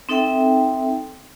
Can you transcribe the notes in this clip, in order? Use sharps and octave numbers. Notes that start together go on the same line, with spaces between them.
C4 D#4 A4 E5 G5